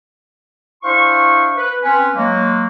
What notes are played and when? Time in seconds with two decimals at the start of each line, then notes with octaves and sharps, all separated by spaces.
0.83 D4 E4 C5 F5 C6 C#6
1.57 B4
1.82 C4 C#4 B4
2.15 F#3 G#3 A#3